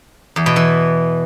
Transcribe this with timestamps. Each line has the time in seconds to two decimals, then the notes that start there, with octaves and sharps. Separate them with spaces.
0.36 E2
0.46 B2
0.56 E3